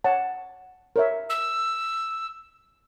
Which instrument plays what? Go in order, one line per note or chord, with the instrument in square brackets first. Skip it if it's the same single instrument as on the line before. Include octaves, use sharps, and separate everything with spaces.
[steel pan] C#5 F#5 A5
A#4 C#5 E5
[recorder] E6